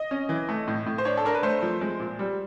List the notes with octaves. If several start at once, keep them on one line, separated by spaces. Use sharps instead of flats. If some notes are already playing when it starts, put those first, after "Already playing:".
Already playing: D#5
C#4
E3
A3
A2
A2
C5
D4 C#5
A4
D4 A#4
B4
A3 C5
F3
G#3
A#2
G3